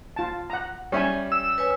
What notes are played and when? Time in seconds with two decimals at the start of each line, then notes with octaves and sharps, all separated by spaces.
0.16 F4 A5
0.50 F#5 A#5
0.92 G3 C#4 C#5 E5 G#5
1.32 E6
1.58 B4 C#5 G#5